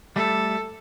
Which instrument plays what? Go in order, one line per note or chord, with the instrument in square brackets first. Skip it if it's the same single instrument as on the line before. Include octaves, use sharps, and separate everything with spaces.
[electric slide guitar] G3 A3 [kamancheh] A4